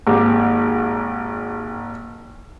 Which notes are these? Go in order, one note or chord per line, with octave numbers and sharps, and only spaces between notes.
G#1 D#2 G4